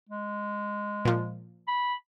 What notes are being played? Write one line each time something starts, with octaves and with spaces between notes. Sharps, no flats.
G#3
A#2 F3
B5